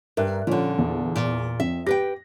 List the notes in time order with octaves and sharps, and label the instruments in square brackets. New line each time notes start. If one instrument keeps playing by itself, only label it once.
[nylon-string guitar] G2 [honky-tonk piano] A#4 E5 F#6
[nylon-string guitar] A#2 D3 [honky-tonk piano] F3 C#4
[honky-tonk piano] E2
[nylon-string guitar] A#2
[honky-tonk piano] F2 [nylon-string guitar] E5
[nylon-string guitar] G4 B4 G5 [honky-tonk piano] A#6